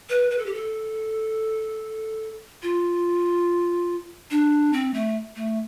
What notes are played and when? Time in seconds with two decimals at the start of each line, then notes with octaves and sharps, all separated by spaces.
0.09 B4
0.31 B4
0.38 A4
0.46 G4
0.53 A4
2.62 F4
4.31 D4
4.73 C4
4.94 A3
5.36 A3